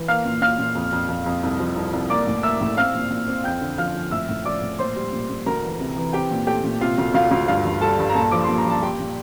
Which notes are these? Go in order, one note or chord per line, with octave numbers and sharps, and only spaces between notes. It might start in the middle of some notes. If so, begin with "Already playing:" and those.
Already playing: E3
A#3 F5 F6
A#2
A#2 F5 F6
A#2
F2
F2
F2
F2
C2
F3
C2
C2
A#3 D5 D6
A2
A#3 E5 E6
A2
C4 F5 F6
A#2
A#2
C4
F2 G5 G6
D3
F3 F5 F6
F2
A2 E5 E6
A2
F3 D5 D6
A2
A#2 C5 C6
G3
A#2
A#2
D2 A#4 A#5
E3
C3
E3
C4 G4 G5
A#2
A3 G4 G5
A#2
C3 F4 F5
D2
D2 F4 F5
D2
G2 F4 F5
G2
G3 A4 A5
G2
A#5
A#2 A4 A5
F3 D6
C6
A#2
A#5
F3 A5
A#2 G4 G5
A#2